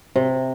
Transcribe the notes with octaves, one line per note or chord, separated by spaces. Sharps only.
C3